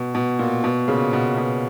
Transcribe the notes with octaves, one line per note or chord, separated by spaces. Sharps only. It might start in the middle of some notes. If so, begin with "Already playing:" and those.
Already playing: B2
B2
A#2
B2
A#2 C#3
B2
B2